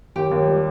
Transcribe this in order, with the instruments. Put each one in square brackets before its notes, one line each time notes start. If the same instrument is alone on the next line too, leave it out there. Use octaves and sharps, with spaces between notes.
[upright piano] D#2 [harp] G4
[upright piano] D#2
G3